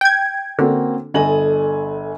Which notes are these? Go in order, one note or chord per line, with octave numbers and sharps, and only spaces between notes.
G5 G#6
D3 A#3 C4 C#4 F#4
G1 A4 D#5 G#5 F#7